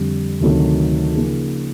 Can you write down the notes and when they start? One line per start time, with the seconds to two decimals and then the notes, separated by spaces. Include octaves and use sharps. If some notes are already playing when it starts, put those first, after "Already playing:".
Already playing: F2 D3 G3
0.41 D2 C3 D#3 F#3 A3
1.16 C#3 F3 A#3 D#4 G#4